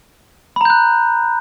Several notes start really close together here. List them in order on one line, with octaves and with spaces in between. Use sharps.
B5 A#5 G6 F#6